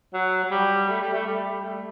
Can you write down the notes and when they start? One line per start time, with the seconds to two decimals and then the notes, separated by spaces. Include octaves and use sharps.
0.14 F#3
0.45 F#3
0.51 G3
0.89 A3
1.02 G3
1.13 A3
1.27 G3
1.65 A3